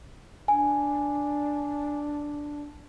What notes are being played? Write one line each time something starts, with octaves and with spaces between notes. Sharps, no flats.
D4 G#5